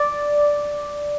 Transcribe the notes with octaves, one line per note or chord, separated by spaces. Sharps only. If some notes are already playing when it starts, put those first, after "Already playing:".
Already playing: D5